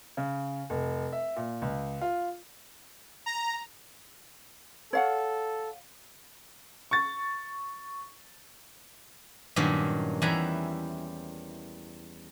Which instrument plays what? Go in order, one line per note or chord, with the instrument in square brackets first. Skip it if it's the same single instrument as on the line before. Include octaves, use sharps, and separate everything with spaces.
[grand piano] C#3
F1
E5
A#2
C#2
F4
[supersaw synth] A#5
[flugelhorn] A4 [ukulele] C#5 F5 F#5
[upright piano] C#6 A6
[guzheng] G2 A#2 D#3 F#3 A#3 C#4
E2 G3 E4 F#5 G#5 A#5